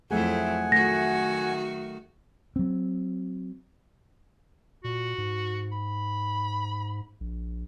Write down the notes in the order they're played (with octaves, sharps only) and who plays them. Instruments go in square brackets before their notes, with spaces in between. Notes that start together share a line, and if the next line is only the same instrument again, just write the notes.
[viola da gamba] F2 C4 E4 [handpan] F#3 A3 G#4 [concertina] F#5 G#5
[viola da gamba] D#3 F#4 [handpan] A3 [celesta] A#6
[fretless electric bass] F#3 C4
[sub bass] A#2 [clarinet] F#4
[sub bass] G#2
[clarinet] B5
[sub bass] A#1